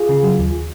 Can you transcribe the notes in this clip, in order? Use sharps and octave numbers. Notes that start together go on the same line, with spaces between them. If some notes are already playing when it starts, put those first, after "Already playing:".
Already playing: F4 G#4
C#3
F#3
D#2